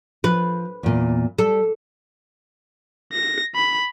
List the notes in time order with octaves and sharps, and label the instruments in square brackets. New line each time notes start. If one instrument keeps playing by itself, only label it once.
[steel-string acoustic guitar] F3 [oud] B4
[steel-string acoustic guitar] E2 A#2
[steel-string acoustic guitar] G3 [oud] A4
[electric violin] A#6
B5